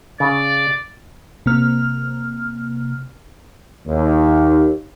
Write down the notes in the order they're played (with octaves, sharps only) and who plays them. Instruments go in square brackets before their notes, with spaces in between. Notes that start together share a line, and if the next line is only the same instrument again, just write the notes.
[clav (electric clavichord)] C#3 [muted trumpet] D5
[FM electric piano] C3 A#3 F6
[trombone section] D#2